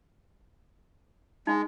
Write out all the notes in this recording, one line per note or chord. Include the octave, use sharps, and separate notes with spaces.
G#3 D#4